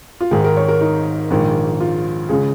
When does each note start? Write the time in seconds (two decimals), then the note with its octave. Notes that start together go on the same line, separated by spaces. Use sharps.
0.21 F4
0.31 G#1 G#2 D#3 G#4
0.44 A#4
0.57 C#5
0.68 A#4
0.81 D#4
1.30 A#1 G#2 D#3
1.81 F4
2.29 C#2 C#3 G#4